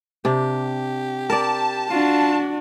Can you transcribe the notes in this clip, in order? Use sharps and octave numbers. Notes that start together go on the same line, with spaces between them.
C3 D4 G4
A#4 D5 A5
D4 F4 F#4